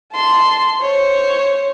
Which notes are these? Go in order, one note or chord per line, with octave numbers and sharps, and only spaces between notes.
A5 C6
C5 C#5